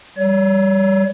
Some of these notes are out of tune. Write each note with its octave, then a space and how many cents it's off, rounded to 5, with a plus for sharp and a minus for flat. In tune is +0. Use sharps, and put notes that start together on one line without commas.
G3 +0 C#5 +30